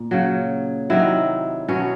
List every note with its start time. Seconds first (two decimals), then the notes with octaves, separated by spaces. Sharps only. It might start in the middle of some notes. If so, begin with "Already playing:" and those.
Already playing: A#2
0.11 C#3 F#3
0.90 C3 D#3 F#3 E4
1.69 B2 F#3 C#4